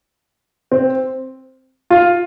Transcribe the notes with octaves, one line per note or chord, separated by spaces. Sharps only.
C4
F4